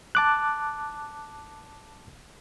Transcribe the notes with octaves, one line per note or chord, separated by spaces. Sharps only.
A5 D6 F#6